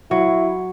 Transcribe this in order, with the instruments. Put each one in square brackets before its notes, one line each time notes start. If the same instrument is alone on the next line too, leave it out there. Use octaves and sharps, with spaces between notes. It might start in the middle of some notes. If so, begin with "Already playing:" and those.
[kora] F#3 [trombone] E4